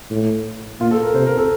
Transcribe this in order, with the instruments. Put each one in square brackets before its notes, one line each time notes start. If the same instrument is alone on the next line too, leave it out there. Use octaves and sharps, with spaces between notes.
[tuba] A2
[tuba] A#2 [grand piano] F4
[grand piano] A4
A#4
[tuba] C3 [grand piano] C5
[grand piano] A#4
A4